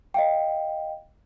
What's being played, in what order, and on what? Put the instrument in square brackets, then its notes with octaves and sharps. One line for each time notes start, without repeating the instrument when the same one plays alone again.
[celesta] D#5 F5 G5